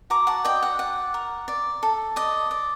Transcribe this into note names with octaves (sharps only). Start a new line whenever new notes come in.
F#4 A#5 D6
F#5 A5
D5 D#5 G5
F#5
D5 F#5
A#4
D5
A4
D5 D#5
D5